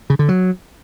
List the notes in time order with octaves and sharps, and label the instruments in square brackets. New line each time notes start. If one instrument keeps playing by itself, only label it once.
[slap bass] C#3
D3
F#3